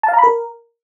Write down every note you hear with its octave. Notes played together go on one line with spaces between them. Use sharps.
A5
F5
A#5
B5
A#4